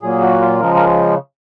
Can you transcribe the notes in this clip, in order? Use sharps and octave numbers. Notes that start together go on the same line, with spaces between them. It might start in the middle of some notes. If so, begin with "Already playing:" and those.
A#2 F#3 A#3 G#4
F#4
F4
C#3 F3 G#3 A#4
A#4